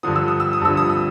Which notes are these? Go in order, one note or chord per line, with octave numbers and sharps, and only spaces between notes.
G2 D3 F3 D#6
E6
D#6
E6
D#6
G2 D3 F3 E6
D#6
E6